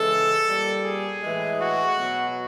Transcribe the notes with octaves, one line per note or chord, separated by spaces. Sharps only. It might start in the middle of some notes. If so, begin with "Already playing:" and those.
Already playing: C#3 E3 G#3 A4
A#2 G3
G#4
A2 E3 G#3
F#4
B2 F#3